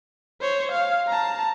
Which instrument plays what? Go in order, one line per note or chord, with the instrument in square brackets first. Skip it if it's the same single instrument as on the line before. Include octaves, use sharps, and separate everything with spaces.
[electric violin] C5 C#5
F5
A5 A#5